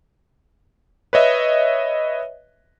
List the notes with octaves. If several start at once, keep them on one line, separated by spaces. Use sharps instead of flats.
B4 C#5 D#5 E5